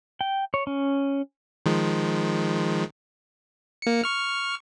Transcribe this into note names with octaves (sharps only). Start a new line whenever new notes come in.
G5
C#5
C#4
D#3 F3 G#3
A#3 C#7
C#6 F6